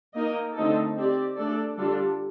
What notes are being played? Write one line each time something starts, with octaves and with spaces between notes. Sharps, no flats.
A#3 D#4 A#4 D#5
D3 A3 C4 D#4 A4
C4 G4 D5
A3 D4 A4 D5
D3 G3 D4 F4 A4